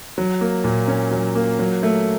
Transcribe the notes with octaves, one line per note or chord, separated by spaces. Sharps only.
F#3
A#3
A#2
C#4
F#3
A#3
F#3
A3